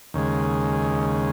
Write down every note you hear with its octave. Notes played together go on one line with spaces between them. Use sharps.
D#2 C#3 G#3